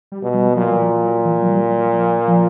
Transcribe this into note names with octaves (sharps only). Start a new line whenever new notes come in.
G3
B2
G3
A#2 F#3
E3
F3
F#3
E3
F#3
G3
F#3
F3
F3